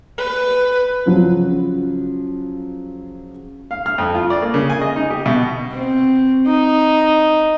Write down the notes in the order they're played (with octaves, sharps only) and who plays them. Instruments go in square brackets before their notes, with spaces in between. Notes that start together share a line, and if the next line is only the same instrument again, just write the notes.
[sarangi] B4
[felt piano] C#3 F3 F#3
[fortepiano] F5
F6
F2
F4
D5
A#3
C#3
G#5
D#5
D#4
G4
B2
[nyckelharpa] C4
D#4